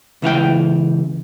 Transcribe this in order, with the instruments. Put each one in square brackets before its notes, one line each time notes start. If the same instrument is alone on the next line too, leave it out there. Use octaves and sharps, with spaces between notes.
[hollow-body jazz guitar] C#2 E3 F5 G5